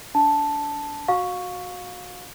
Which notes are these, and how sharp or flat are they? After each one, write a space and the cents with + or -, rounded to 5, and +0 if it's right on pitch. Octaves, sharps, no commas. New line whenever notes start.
D4 -30 A5 +0
F#4 -15 F5 +30 C#6 +0